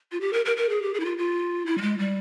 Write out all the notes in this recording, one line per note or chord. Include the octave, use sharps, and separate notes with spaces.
F4
G4
A#4
A#4
A#4
G#4
G4
G#4
E4
F4
F4
E4
G3
G#3
G3